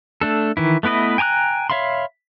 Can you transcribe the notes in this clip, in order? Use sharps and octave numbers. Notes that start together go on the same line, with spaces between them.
A3 D4 A4
D#3 E3 E4
A3 B3 E4 B4 D#5
G5 G#5 A#5 D6 F#6
C#5 E5 F5 B5 C6